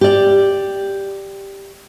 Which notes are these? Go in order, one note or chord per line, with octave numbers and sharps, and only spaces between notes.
G4 D5